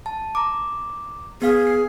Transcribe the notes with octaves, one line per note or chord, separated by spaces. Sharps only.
A5
A#5 D6
B3 G#4 F5
C7